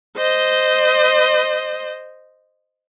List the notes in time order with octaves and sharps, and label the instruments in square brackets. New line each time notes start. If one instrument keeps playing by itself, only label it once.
[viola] C5 D#5